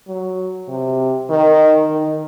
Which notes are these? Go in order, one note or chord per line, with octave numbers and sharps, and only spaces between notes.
F#3
C3
D#3
D#3